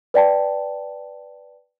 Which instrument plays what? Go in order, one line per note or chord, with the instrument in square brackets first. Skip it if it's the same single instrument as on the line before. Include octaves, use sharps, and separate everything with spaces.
[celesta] B4 D5 G5 A5